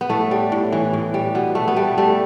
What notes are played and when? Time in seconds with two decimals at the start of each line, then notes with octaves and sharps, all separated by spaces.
0.01 B3
0.09 A2 A3
0.31 G3
0.52 A2
0.73 E3
0.93 A2
1.14 G3
1.35 B2 B3
1.55 B2 A3
1.68 B3
1.76 G3 A3
1.98 G3 A3